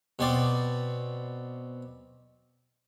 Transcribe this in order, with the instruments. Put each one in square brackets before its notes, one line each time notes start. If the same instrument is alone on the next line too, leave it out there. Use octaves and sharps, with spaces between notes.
[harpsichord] B2 C4 D5